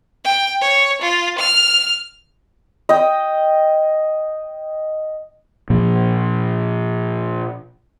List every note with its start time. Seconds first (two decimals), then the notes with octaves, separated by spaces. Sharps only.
0.24 G5
0.61 C#5
1.02 F4
1.38 F6
2.89 D#5 G5
5.70 A#2 F3